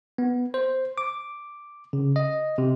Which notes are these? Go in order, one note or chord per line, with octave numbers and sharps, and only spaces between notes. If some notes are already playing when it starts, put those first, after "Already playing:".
B3
C5
D6
C#3
D#5
C3